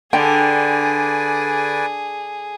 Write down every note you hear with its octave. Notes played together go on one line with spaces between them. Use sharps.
D3 G#4 B4 D5 G5 G#5